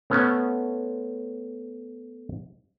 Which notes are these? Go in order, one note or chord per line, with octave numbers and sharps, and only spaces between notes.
A3 B3 C#4